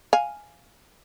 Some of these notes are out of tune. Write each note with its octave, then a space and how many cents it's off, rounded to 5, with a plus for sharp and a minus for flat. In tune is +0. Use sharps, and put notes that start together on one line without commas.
F5 +0 G#5 +0